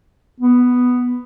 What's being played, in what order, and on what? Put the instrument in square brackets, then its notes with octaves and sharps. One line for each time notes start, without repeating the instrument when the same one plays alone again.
[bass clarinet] B3